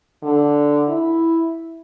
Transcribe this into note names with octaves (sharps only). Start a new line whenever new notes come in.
D3
E4